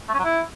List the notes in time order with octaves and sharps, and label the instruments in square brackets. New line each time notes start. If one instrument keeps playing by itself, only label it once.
[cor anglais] A3
C#4
F#3
E4